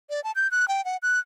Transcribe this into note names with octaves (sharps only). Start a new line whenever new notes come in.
D5
A5
G6
F#6
G5
F#5
F#6